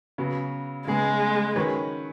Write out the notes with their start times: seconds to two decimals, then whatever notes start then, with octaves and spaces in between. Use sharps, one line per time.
0.18 C#3 F#3 B3
0.87 C#3 G#3 B3 G#4
1.56 D#3 F#3 C#4 B4